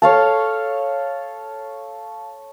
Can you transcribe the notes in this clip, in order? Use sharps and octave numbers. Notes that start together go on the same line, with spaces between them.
A4 C#5 F5 A5